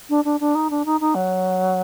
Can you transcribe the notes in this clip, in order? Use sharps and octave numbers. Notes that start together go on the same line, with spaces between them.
D4
D4
D4
D#4
D4
D#4
D#4
F#3